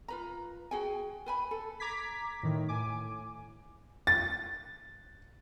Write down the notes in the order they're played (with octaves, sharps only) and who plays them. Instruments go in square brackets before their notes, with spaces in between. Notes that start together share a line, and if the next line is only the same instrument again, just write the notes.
[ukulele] F4 B4 A#5
F#4 G#4 G5 G#5
B4 G#5 B5
A4
[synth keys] A#5 D6 G#6 B6
A2 D#3
A2 G#5 D6
[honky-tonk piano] A6